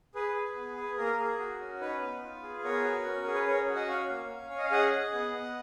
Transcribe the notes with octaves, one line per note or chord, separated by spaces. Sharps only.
G#4 B4
G#4
B3
G#4
A#3 A#4
G#4
F#4
C#4
D#4 B4
B3
F4
G#4
B3 A#4 C#5
F#4
C#4
G#4 A#4
B4
C#4 A#4 C#5
F#4
D#5 F#5
C#4 C#5 F5
A#3
C#4
C#4 C#5
D#5
F5
G#4 D#5 F#5
G#4
B3
B3